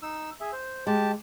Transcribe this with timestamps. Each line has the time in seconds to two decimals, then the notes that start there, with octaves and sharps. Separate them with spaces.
0.02 D#4 E6
0.40 G#4 E5
0.53 C5
0.87 G#3 G4 A5